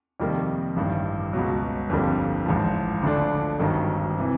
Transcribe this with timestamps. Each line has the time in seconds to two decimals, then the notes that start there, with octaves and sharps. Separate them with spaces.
0.20 F2 C3 D#3 G3 A#3
0.76 A1 G2 D#3
1.33 C#2 B2 F#3
1.90 G1 F2 D3 G3 A#3
2.46 A1 G#2 F3
3.02 D2 D3 F3 A3 D4
3.60 G#1 G2 D#3 F#3
4.18 C3 E3